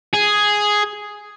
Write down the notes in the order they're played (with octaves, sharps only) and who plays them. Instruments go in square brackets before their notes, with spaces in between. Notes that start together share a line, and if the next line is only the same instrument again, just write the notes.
[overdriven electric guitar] G#4